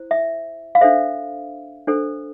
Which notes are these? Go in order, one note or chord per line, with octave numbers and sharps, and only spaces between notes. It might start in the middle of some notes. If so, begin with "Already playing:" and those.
Already playing: E4 C5
E5
F5
D4 A4 C5 E5
D4 A4 C5